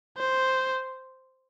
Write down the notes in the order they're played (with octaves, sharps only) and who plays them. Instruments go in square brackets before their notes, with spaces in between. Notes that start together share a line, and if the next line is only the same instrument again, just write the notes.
[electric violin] C5